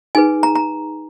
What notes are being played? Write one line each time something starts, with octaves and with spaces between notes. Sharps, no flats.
D#4 G#4 B4 G#5
A#5
A#5